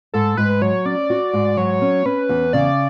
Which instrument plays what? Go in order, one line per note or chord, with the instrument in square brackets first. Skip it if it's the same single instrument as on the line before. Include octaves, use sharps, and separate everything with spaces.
[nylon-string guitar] G#2 [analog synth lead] A4
[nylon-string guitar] G#2 [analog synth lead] B4
[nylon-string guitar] F#3 [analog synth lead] C#5
[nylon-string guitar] C#4 [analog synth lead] D5
[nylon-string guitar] F#4
G#2
[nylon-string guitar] F#3 [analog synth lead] C#5
[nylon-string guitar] C#4
[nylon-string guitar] C#4 [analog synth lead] B4
[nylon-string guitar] E2
[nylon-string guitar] C#3 [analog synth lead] D5